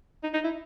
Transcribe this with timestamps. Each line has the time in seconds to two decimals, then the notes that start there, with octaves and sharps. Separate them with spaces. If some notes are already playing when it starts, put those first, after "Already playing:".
0.23 D#4
0.34 D#4
0.44 E4